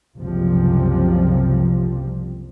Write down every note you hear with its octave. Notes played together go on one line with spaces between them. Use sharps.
F#1 C2 C3 F3 G3